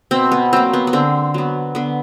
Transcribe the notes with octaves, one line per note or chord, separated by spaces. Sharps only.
B2 C4
B3
F#3 A#3 C4
B3
B3
D3 C4
F#3 B3
D3 B3